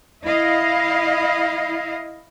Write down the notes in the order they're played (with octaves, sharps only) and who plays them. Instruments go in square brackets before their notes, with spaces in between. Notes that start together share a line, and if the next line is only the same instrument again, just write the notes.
[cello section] E4 D#5 F5